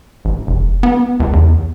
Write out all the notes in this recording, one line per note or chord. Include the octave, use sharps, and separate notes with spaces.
A1
F1
B3
C#2
E2